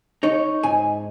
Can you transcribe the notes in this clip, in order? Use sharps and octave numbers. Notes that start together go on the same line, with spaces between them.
D#4 C#5
G#2 G#5